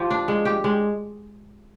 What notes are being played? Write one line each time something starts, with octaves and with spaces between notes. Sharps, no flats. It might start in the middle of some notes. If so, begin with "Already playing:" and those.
Already playing: F3 G4
D4
G#3
G4
G#3